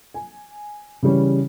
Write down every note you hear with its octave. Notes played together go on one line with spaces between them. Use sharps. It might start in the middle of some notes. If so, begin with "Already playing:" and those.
G#5
C#3 E3 G3 C#4